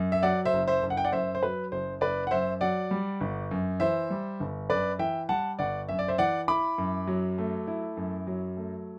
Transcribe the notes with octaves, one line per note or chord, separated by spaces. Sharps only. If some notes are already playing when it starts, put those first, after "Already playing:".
Already playing: F#2
E5
F#3 D5 F#5
C5 E5
F#1
C5 E5
F#1
F#5
G5
D5 F#5
F#2 C5 E5
C5
F#3 B4
F#1 C5
F#1 B4 D5
F#5
F#2 C5 E5
F#3 D5 F#5
G3
G1
F#2
E3 C5 E5
G3
G1
F#2 B4 D5
E3 E5 G5
G3 F#5 A5
G1 D5 F#5
F#2 E5
D5
C5 E5
E3 D5 F#5
E4 B5 D6
F#2
F#3
A3
E4
F#2
F#3
A3